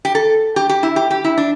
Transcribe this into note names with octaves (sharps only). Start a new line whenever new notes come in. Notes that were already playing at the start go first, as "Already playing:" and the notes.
G4
A4
G4
G4
E4
G4
G4
E4
D4